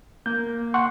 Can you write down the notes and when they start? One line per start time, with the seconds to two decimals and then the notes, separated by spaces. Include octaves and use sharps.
0.26 A#3 G6
0.74 F#5 C6 C#6